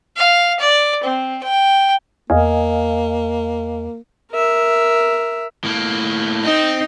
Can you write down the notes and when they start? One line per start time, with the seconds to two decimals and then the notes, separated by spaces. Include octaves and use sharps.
0.17 F5
0.60 D5
1.04 C4
1.43 G5
2.30 E2 A#3 D#5 F5 G#5
4.33 A#4 E5
5.64 A2 A#3
6.45 C4 D#4